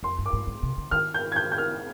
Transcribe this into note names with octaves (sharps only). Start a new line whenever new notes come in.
F2 C6
G2
D6
G#2
G#2
C3
D3
D#3 F6
G6
G#6
G6
G6
F6